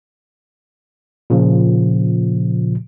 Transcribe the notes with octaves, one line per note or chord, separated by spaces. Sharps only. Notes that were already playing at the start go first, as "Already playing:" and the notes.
A#2 C#3 F3